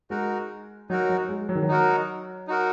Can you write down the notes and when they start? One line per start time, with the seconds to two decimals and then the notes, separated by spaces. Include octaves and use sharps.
0.10 G#3 D#4 F#4 A#4
0.90 F#3 D#4 F#4 A#4
1.09 F#3
1.29 G#3
1.49 F#3
1.55 D#3
1.62 F#3
1.69 D#4 F#4 A#4
2.47 D#4 F#4 A#4